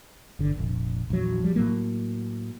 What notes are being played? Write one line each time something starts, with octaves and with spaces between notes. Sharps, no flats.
G1 D3
F1 A#1
A#1 E2 F#3
F3 G3
A2 F#3 A#3